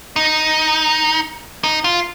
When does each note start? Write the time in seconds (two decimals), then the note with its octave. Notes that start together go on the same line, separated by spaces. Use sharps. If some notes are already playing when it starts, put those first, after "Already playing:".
0.16 D#4
1.64 D#4
1.84 F4